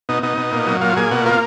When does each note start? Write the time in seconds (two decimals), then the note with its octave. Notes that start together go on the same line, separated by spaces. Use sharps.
0.09 B2 D#4
0.23 B2 D#4
0.37 B2
0.52 A#2
0.67 F#3
0.81 A#2 F4
0.96 A#2 G#4
1.11 B2 F#4
1.26 A#3 F4